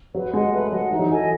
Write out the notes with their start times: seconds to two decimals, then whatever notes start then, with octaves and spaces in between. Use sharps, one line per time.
0.14 F#3 B4
0.33 G#3 D#5 F#5
0.53 A3 B4
0.72 F#3 D#5 F#5
0.91 E3 D#4
0.99 F#3
1.08 E3 A4 D#5 G#5